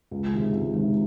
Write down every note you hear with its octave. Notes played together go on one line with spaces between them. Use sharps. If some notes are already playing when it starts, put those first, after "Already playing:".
C#2
C3 D#3 G#3
C#2
C3 D#3 G#3